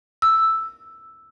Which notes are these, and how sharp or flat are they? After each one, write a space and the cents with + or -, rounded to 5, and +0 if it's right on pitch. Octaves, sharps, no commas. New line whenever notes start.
E6 +0